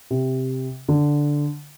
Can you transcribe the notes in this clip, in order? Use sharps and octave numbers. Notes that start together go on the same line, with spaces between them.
C3
D3